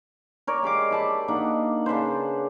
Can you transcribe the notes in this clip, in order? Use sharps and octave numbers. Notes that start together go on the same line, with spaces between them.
A#4 C#5 D5
G#3 G4 F5 D6
E4 A5 B5
A#3 D4 D#4 F#5
C#3 D4 B4 C5